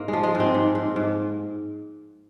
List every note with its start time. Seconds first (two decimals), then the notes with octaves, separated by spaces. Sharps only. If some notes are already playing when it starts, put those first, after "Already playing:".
Already playing: G#2 A#3
0.08 G#3
0.13 F3
0.23 G#3
0.35 G#2
0.40 C4
0.54 G#2
0.75 G#2
0.96 G#2